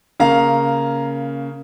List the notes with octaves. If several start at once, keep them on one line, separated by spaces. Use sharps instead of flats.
C#3 A#3 F5 A#5